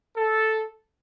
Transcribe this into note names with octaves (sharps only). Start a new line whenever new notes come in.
A4